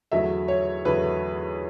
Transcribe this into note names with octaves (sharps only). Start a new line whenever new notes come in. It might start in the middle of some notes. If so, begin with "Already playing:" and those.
E2 D3 F#3 A3 E5
C#5
E2 D3 F#3 A3 B4